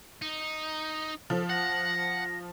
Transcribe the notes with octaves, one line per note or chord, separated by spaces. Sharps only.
D#4
F3 A4
F#5 A#6